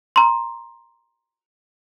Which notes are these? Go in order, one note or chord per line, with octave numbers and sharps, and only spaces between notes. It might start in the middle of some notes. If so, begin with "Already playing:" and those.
A#5 C6